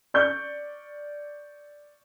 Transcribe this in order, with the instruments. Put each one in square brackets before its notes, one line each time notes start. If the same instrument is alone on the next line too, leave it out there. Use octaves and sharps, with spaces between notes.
[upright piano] D5 C#6 G6